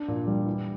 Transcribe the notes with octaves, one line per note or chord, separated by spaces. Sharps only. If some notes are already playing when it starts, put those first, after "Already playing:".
Already playing: D4
A#2
G3
E3